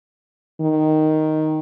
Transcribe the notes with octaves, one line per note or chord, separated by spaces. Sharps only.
D#3